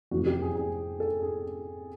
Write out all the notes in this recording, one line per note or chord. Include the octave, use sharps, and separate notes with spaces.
F2 C3 E3 A3 F#4
G4
G#4
G#4
A4
G#4